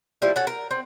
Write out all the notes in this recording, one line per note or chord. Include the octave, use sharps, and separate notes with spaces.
F3 G3 A#3 E4
C#4 F#4 A4 F#5
A#4
C4